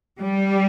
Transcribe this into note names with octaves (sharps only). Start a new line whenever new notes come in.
G3